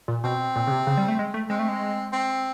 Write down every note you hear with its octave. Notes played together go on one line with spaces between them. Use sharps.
A#2
B2 C4
A#2
C#3
C3
C#3
G3
A3
G#3
A3
G#3 C4
A3
G#3
C4